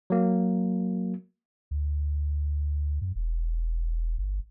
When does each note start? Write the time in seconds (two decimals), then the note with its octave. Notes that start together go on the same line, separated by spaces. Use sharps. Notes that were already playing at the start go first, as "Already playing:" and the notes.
0.10 F#3 A#3
1.71 D2
3.01 F#2
3.15 E1
4.18 G1